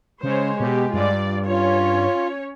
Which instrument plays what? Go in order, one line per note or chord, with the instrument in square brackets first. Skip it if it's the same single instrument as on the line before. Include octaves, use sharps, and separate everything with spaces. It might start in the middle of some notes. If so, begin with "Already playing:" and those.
[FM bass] C#3 [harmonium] G#3 [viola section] C5 C#5
[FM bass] B2 [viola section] G4
[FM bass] G2 [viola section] F4 D5
[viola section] C#4 C#5 [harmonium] F4